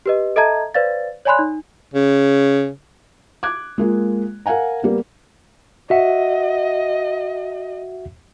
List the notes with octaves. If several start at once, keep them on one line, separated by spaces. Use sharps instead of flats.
G4 B4 D#5
A4 D#5 E5 A5 A#5 G#6
B4 C5 D5 F5 A6
C#5 D5 G#5 B5 C6 F#6
D#4
C#3
D6 F#6 G#6
G#3 A#3 F4
A#4 F5 F#5 G#5 A#5
G3 A#3 B3
F#4 D#5 E5 F#5